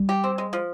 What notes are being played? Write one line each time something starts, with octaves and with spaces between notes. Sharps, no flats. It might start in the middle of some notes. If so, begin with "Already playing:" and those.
Already playing: G3
G4
C4
G#3
F3